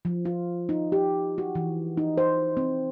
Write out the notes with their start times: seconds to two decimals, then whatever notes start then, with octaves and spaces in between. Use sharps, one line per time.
0.05 F3
0.25 F4
0.69 D#4
0.92 G4
1.38 F#4
1.55 E3
1.97 D#4
2.18 C5
2.57 C4